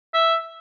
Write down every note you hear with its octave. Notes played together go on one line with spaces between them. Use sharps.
E5